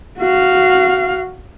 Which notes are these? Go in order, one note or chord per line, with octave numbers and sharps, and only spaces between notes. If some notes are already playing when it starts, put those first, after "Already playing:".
F#4 F5